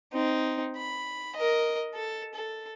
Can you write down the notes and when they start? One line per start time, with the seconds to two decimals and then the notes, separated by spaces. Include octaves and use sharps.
0.13 C4 D#4
0.76 B5
1.36 A#4 D#5
1.94 A4
2.34 A4